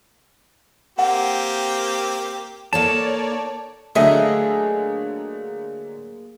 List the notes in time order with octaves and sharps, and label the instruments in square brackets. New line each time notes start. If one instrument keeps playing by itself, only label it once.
[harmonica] A#3 C4 G4 [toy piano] F#5
[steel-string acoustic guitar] A#3 D#4 A4 [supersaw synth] C#5 D5 [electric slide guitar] A5
[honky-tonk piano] D3 F#3 A3 [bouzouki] A#3 G#4 D#5 [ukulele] A4 E5